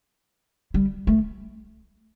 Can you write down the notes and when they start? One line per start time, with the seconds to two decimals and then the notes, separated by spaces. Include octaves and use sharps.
0.74 G3
1.07 A3